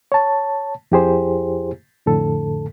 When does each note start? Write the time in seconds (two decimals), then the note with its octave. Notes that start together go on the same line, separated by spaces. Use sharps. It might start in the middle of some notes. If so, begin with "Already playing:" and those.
0.12 C#5 A5
0.92 F2 E4 G4 G#4 C5
2.06 F2 A2 D3 A4